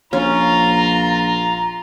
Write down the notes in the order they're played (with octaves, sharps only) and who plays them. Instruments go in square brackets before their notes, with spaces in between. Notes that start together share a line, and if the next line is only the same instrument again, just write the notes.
[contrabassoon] A#1 [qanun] C#4 [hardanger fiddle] F4 [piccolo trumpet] A#5